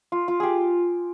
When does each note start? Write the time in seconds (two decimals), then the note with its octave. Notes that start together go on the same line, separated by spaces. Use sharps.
0.12 F4
0.28 F4
0.40 G4 G#4